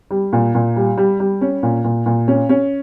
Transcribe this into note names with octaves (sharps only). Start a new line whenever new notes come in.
G3
A#2
A#2
G3
G3
G3
C#4
A#2
A#2
A#2
C#4
C#4